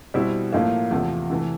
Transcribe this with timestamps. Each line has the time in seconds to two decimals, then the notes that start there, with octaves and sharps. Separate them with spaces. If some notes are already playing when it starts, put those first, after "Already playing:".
0.14 B2 G3 C4 E4
0.52 A2 F3 A#3
0.91 E2 C3 F3 A3
1.30 C3 E3 A3